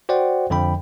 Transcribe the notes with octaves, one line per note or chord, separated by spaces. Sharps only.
F#4 C5 D5 F#5 G5
F2 D3 F3 G5 B5